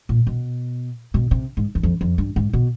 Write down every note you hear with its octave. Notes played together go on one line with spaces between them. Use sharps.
A#2
B2
B2
C3
G#2
E2
F2
F2
G2
G#2
B2